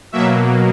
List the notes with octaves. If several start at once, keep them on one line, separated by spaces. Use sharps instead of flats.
B2 F#3 A#3 E5